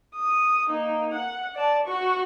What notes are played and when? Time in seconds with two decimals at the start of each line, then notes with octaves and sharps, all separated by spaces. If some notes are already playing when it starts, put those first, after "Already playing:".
0.15 D#6
0.69 A#3 D#4
1.14 F#5
1.56 D5 A5
1.86 F#4 C#6